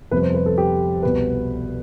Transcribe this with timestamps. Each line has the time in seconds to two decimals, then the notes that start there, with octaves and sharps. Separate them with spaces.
0.11 F2 C3 G3 B3 B4
0.23 C5
0.34 B4
0.46 A4
0.58 G4
1.03 C2 B2 B3 B4